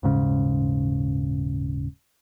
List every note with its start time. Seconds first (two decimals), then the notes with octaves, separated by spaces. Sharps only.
0.03 D#1 G#2 C#3